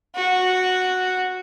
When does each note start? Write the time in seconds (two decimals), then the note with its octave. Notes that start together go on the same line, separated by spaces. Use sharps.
0.15 F#4